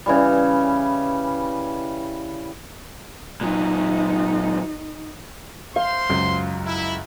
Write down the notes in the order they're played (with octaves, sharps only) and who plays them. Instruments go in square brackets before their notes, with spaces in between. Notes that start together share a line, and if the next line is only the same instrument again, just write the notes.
[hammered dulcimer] C#3 E3 G3
[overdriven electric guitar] A#2 F#3 [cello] D#4
[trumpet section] C5 C6 [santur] F5
[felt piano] C#2 F#2
[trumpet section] E4